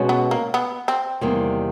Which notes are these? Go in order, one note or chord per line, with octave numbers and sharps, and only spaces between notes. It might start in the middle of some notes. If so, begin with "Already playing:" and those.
Already playing: B2 G#3 C#4 F#4
B3
A#3
B3
C4
E2 C3 D#3 G3 A#3